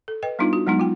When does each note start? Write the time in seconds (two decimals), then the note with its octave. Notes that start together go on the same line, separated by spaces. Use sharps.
0.08 A4
0.23 B4 D#5 G5
0.39 G3 B3 D4 D#4 F4
0.53 F#4
0.67 F#3 G#3 B3 D#4
0.80 F4 G5